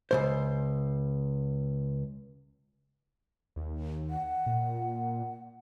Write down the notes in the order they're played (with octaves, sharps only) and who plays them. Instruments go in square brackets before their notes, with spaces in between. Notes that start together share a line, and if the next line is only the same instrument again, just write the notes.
[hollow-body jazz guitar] C#2 C3 C5
[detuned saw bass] D#2
[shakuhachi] F#5
[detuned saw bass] A#2